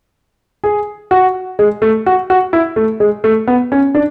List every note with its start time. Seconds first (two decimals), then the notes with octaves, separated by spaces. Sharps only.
0.64 G#4
1.11 F#4
1.59 G#3
1.82 A3
2.06 F#4
2.30 F#4
2.53 E4
2.76 A3
3.00 G#3
3.24 A3
3.48 B3
3.72 C#4
3.95 D4